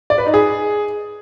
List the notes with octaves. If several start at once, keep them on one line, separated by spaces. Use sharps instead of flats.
D5
B4
D#4
G#4